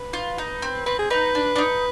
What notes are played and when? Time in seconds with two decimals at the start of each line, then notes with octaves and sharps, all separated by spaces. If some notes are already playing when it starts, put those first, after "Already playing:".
Already playing: B4
0.13 F4
0.38 D#4
0.62 C4
0.86 C4 B4
0.99 G#4
1.10 D#4 B4
1.35 D4
1.56 D4
1.58 D#4